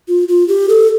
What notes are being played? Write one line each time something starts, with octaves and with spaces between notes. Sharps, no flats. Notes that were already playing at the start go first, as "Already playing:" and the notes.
F4
F4
G4
A4